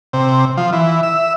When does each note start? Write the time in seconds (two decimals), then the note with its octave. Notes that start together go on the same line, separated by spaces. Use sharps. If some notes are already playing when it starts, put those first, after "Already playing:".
0.13 C3
0.57 F3
0.73 E3
1.03 E5